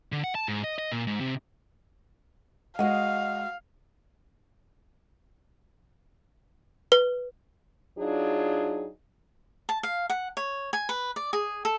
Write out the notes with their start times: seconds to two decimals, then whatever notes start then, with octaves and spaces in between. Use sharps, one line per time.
0.12 D3
0.24 F#5
0.35 A5
0.48 G#2
0.64 D#5
0.79 D#5
0.92 A#2
1.07 G#2
1.21 C3
2.79 G#3 F#4 D#5 F5 F#5
6.92 B4
7.98 F#3 D4 D#4 F4 G#4
9.69 A5
9.83 F5
10.10 F#5
10.37 C#5
10.73 G#5
10.89 B4
11.16 D5
11.33 G#4
11.65 A4